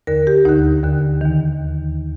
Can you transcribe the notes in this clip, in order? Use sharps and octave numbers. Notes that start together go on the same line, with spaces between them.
D#2 D3 A#4
G4
D2 D3 D#4
D#2 D3
D#2 D#3